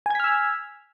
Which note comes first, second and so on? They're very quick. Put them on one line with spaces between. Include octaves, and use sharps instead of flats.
G#5 G#6 B6 F6 E6